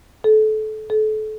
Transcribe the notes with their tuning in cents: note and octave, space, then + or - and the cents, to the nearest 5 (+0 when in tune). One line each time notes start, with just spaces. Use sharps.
A4 -25
A4 -30